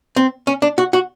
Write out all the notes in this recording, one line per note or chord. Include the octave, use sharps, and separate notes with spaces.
C4
C#4
D4
F#4
F#4